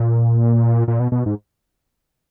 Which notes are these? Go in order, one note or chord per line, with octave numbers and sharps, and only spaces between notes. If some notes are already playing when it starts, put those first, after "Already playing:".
Already playing: A#2
A#2
B2
B2
G#2